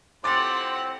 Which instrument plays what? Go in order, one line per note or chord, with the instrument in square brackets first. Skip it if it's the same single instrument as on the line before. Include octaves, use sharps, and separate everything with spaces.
[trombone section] F2 A2 C4 [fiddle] G4 F#5 [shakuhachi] C6 [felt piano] D6 A6